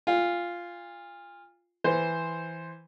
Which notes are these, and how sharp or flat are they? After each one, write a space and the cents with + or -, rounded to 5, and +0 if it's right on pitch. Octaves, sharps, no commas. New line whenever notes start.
F4 -5 G#5 -35
E3 +0 C5 +0